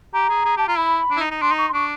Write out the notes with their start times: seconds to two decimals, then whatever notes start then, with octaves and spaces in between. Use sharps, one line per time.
0.13 G4 A#5
0.30 G#4
0.45 G#4
0.56 G4 A5
0.68 F4 A#5
0.77 E4 B5
1.10 D4
1.17 E4
1.20 D#4
1.31 D#4
1.42 D4 C6
1.51 D#4
1.58 C#6
1.69 C6
1.73 D4 C#6